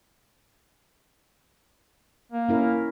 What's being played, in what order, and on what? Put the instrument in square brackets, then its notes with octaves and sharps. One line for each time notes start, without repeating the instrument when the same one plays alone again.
[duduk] A#3
[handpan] C#4 E4 A#4